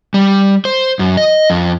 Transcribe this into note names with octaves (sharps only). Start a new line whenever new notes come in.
G3
C5
F#2
D#5
F2